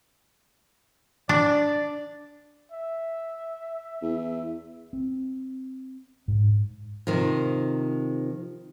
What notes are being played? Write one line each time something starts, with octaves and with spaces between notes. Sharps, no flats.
D4 D5
E5
E2
C4
G#2
C3 D#3 F3